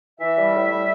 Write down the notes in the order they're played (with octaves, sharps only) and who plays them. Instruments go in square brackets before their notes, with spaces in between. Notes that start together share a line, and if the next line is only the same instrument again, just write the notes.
[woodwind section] E3 E5
G3
A2
G3